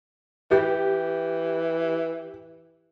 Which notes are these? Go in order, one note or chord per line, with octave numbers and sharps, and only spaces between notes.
E3 G4